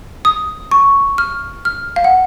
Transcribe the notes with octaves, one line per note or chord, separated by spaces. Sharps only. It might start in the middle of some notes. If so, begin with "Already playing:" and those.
D#6
C#6
F6
F6
F5
F#5